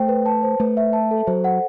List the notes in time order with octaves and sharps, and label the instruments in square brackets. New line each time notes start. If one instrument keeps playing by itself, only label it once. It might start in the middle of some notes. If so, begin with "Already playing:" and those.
Already playing: [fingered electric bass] A3 [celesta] C5 G5
[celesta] B4
A5
C5
[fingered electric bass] A3 [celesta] B4
[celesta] E5
A5
A4
[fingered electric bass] F#3 [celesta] C5
[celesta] F#5